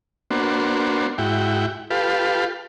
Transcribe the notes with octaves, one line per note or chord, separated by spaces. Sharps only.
A#3 B3 D4 F#4 C5
G#2 E4 F#4 G5
F4 G4 A4 B4 F5